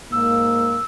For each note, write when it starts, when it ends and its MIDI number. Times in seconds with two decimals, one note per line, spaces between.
0.12 0.78 44
0.12 0.78 58
0.12 0.85 88